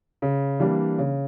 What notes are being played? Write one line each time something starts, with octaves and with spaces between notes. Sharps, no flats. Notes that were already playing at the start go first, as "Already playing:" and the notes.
C#3
E3 G3 A#3 D4
C#3